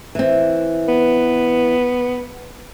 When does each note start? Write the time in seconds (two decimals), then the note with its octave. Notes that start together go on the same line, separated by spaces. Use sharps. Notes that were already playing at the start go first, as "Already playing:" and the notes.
0.15 E3 C4
0.88 B3